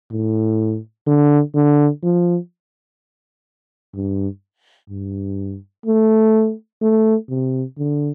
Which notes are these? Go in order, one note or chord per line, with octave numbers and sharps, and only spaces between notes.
A2
D3
D3
F3
G2
G2
A3
A3
C3
D3